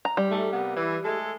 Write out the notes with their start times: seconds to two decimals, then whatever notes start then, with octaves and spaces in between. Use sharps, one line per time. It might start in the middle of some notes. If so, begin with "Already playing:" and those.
0.05 A#5
0.17 G3
0.30 G#2 A3
0.51 C3 A#3 B3
0.75 E3
1.04 G#3 A3 A4